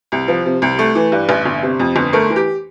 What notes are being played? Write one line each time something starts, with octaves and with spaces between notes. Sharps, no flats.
C2
F3
C3
C2
A3
E3
G2
A1
G1
C3
F2
G1
A3 A#4
E3
G4